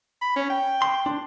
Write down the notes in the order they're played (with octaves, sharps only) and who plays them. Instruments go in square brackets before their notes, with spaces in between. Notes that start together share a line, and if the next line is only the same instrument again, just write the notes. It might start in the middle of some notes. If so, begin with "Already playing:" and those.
[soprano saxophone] B5
C#4
G5
[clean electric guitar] C6
D4